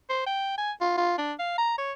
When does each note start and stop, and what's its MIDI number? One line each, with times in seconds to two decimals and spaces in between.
0.09 0.21 72
0.26 0.52 79
0.58 0.72 80
0.81 0.96 65
0.97 1.16 65
1.18 1.33 62
1.39 1.56 77
1.58 1.74 82
1.78 1.92 73